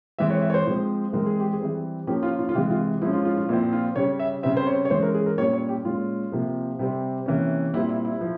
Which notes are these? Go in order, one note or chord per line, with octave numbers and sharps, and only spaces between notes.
E3 G#3 C4 E5
C#5
E5
C#5
C5
F3 G#3 C4
E3 G#3 C4 A#4
G#4
G4
G#4
E3 G3 C4
F3 A#3 C#4 G4
F4
F4
F4
C3 E3 G#3 G4
F4
F3 G#3 C#4 E4
F4
F4
F4
A#2 F3 C4 E4
F4
C#3 G3 C#4 C#5
E5
C#3 G3 C4 E5
C5
C#5
C#5
E3 G#3 C#4 C5
A#4
G#4
A#4
A#2 G3 C#4 C#5
C#5
G4
A#2 G#3 C#4 F4
C3 F3 A#3
C3 G3 C4
C3 E3 A#3 C#4
A#2 G3 C4 E4
E4
E4
F3